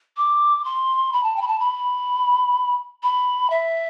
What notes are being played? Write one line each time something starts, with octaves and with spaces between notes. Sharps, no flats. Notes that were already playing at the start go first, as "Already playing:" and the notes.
D6
C6
B5
A5
G5
B5
A5
B5
B5
E5